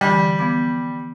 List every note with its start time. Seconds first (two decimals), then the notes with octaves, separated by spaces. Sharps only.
0.01 D3 E3 G3
0.39 F3 B3 D6